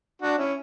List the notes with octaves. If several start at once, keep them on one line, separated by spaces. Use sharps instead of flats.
D4 F#4
C#4 E4